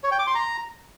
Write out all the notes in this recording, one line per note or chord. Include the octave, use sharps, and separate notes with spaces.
C#5
G5
D6
C6
A#5